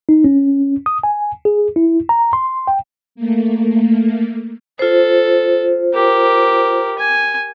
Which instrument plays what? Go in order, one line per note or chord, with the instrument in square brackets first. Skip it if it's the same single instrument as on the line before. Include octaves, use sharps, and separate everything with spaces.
[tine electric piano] D#4
C#4
D#6
G#5
G#4
E4
A#5
C6
G5
[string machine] A3 A#3
[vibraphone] F4 C5 [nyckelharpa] A4
[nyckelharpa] G4 A#4
G#5